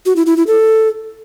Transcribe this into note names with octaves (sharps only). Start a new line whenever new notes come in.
F#4
E4
E4
E4
A4